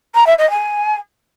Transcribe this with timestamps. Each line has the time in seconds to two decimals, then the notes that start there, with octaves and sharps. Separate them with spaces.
0.15 A#5
0.26 E5
0.38 D#5
0.50 G#5